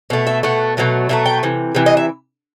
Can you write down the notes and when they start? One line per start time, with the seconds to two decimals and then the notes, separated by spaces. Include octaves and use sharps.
0.10 B2 A3
0.27 E5
0.43 B2 A3 F#5
0.77 B2 F#3 A3
1.09 B2 F#3 A3 E5
1.26 G5
1.43 C3 E3
1.75 C3 E3
1.86 D#5
1.97 E5